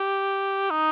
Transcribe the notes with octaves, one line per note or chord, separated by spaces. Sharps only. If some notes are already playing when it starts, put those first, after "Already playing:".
Already playing: G4
D#4